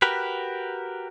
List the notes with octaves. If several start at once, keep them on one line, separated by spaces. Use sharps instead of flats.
F#4 G4 A#4 B4